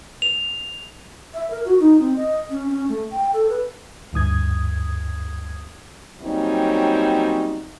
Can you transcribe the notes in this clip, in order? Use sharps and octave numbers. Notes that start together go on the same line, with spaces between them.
F7
E5
A#4
F#4
D#4
C4
D#5
C#4
C#4
A3
G5
A4
B4
D2 G2 D#6 G#6
F#3 G3 A#3 C4 C#4 D#4